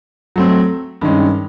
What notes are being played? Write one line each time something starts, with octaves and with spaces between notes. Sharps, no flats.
F#3 A3 C4
G2 D#3 G#3 C#4